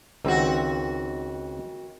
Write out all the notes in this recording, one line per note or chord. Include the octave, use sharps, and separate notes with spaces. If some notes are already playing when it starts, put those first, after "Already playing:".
C#2 D#3 C4 F#4 F5